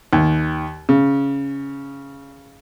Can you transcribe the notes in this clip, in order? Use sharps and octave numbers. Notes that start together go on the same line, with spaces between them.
D#2
C#3